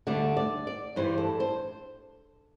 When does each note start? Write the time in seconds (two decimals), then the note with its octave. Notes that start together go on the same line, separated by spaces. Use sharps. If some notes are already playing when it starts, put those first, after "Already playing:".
0.07 D2 D3 G3 D5
0.37 D5
0.67 D5
0.96 G2 E3 G3 C5
1.18 A4
1.40 C5